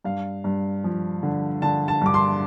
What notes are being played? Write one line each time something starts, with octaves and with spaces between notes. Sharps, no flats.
G2 F5
G2
F3
D3
D3 A5
A5
G2 D6
C6